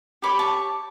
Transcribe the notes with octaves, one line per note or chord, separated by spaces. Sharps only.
G4 C#5 B5 D6
A5 C#6